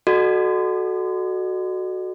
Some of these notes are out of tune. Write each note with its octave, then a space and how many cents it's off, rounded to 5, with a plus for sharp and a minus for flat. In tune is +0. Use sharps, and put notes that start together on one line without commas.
F#4 +0 A4 -20 D#5 -40